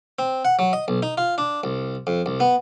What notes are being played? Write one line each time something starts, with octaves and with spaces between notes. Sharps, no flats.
C4
F#5
F#3
D#5
B1
D#4
F4
D4
C2
F2
C2
B3